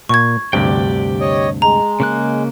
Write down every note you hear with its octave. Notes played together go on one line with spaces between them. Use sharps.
A#2 C#6 G#6
D2 G2 C3 G4 D5 G5
C#5 D#5
G#3 A#5
C#3 A#3 F#6